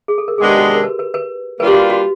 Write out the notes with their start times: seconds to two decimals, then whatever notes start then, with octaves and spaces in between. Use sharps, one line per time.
0.08 G#4
0.18 A4
0.28 A#4
0.38 C3 D#3 G#3 B3 D4 G#4
0.48 G4
0.58 F#4
0.75 A#4
0.84 B4
0.99 B4
1.14 B4
1.59 G3 A#3 D4 F4 B4
1.67 G4
1.74 F#4
1.90 F#4